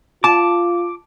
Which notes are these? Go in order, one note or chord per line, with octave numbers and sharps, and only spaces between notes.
F4 A5 D6